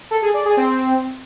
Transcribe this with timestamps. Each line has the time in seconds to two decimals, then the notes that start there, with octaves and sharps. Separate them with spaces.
0.11 A4
0.22 G#4
0.34 D5
0.45 G#4
0.57 C4